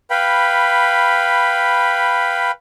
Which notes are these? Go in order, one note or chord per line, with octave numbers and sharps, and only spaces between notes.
B4 F5 G5 B5